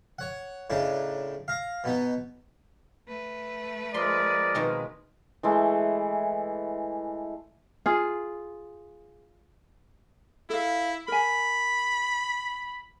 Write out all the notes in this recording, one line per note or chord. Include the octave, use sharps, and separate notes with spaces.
C#5 F#5
A2 C#3 D4 D#4
F5 A#5
B2 B3 D#4
A3 B4
F3 G#3 A#4 D5 C6
B2 D#3 C4
E3 G#3 A3
F4 G#4
E4 A4 F5
A#4 G#5 B5